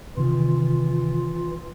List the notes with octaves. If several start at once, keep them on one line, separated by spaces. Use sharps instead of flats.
C3 D#3 E3 F4